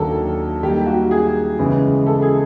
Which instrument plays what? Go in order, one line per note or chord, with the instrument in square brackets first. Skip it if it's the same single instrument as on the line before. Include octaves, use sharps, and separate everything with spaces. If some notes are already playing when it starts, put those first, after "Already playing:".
Already playing: [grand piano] D#2 D#3 F#3 A#3 D4 [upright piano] A4
[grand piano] D#3 G3 A#3 [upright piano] G4
[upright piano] F#4
G#4
[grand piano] C#3 E3 G#3 B3
[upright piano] A4
G#4